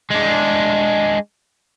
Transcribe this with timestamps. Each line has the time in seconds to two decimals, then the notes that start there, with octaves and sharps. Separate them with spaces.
0.10 G#3 D4